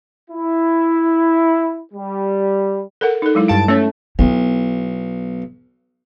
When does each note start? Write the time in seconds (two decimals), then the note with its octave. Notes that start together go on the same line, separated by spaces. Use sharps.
0.31 E4
1.93 G3
3.01 A4 A#4 F#5
3.22 D#4 A4
3.35 F#3 G#3 E4
3.48 G2 F5 A5 D7
3.68 A3 C#4 C#5
4.19 B1 B3 E4